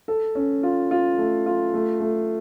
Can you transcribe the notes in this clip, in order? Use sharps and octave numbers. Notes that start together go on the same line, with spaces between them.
A4
C#4
F4
F4
A3
F4
A3
A3